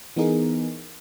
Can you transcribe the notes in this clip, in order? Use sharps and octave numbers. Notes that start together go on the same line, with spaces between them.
E3 B3 D#4 G#4 A#4